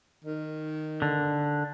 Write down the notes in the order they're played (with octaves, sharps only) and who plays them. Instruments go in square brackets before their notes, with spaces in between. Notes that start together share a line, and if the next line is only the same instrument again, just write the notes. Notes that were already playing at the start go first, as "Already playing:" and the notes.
[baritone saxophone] D#3
[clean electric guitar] D3